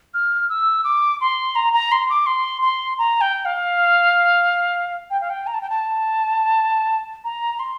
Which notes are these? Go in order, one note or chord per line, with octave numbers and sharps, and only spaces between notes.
F6
E6
D6
C6
A#5
A#5
C6
D6
C6
C6
A#5
G5
F5
G5
F5
G5
A#5
A5
G5
A5
A#5
C6